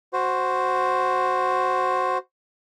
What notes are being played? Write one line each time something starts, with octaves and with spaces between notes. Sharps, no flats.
F#4 C5